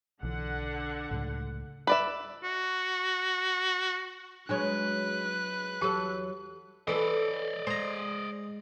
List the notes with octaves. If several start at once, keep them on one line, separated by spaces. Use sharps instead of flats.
B1 D3 E3 F#5
C#2 A2
B4 D5 E5
F#4
F#3 G#3 D4 B4 C#5 F#6
E2 F#3 G4 A4 A5
E3 A4 B4 C5 D5 D#5
G#3 C5 A#5